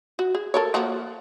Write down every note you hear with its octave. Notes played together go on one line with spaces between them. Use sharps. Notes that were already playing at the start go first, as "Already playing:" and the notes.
F#4
G#4
A4 A#4 C#5
F3 A#3 F#4